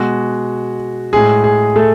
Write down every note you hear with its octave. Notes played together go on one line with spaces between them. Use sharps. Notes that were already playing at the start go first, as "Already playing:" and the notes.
Already playing: B2 G#3 F#4
A2 G#3 G#4
G#4
A3 A4